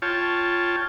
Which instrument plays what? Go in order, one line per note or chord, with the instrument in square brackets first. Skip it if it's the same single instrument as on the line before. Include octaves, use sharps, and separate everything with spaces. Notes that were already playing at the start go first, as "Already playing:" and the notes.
[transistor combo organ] F4 C#5 G5 A5